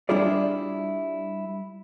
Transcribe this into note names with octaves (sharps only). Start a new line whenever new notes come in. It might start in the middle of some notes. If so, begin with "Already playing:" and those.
G3 D4 E4 F4 G#4 D5